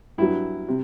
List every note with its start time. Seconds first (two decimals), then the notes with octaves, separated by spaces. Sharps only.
0.18 G2 F#3 E4
0.68 C3